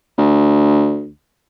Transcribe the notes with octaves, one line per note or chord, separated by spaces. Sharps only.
D2